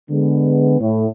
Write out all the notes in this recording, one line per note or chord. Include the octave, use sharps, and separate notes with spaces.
D3 G#3 B3
A2